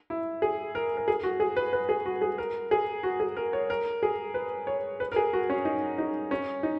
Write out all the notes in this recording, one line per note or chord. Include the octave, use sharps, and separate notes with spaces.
E4
G#4
A#4
A#4
G#4
F#4
G#4
B4
B4
G#4
F#4
G#4
A#4
G#4
F#4
G#4
A#4
C#5
A#4
G#4
B4
C#5
B4
A#4
G#4
F#4
C#4
D#4
D#4
C#4
D#4